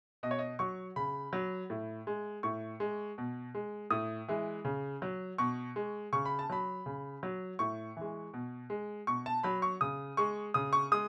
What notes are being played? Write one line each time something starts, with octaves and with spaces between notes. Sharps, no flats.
B2 D#5
C#5
D#5
F#3 C#6
C#3 B5
F#3
A2
G#3
A2 C#6
G#3
B2
G#3
A2 D#6
E3 G#3
C#3
F#3
B2 C#6
G#3
C#3 C#6
B5
A5
F#3 B5
C#3
F#3
A2 C#6
E3 G#3
B2
G#3
B2 C#6
A5
F#3 B5
C#6
C#3 D#6
G#3 C#6
C#3 D#6
C#6
G#3 D#6